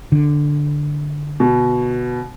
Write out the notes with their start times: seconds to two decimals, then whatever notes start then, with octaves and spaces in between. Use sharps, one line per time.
0.12 D3
1.40 B2